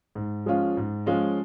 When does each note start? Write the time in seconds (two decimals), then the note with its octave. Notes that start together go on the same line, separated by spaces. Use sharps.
0.15 G#2
0.46 F3 G#3 C#4 F4
0.77 G#2
1.06 F3 G#3 C#4 F4